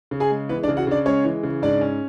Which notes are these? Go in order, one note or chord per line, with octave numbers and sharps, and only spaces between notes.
C#3
G#4 G#5
G#3
E3 B3 B4
D4 D5
C#3
F#4 F#5
C#3 D4 D5
G#3 C#4 C#5
E3
C#3
G#2 D4 D5
C#4